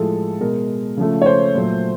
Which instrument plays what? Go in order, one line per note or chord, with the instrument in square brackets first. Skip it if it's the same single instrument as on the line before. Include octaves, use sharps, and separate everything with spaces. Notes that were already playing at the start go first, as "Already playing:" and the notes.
Already playing: [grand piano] A2 F3 G#3 A4
B2 G#3 A#4
C#3 F3 A3
C#5
C5
A#2 F#3 A3